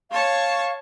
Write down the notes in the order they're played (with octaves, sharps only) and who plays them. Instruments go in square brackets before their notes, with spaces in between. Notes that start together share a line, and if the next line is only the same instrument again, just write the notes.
[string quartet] C#5 A5 C#6 [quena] F5